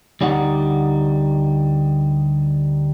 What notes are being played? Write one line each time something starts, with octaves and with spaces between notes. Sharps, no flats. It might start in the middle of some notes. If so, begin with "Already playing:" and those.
D2 G3 D#4 D5 F#5